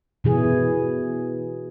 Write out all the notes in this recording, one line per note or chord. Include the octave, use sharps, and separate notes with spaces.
B2 E3 G#4